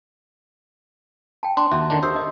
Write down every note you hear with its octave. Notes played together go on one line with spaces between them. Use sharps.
G5 A5
D4 C6
D#2 F#4 E5
D3 D#3 D4
G4 C5 D#6 E6
D#5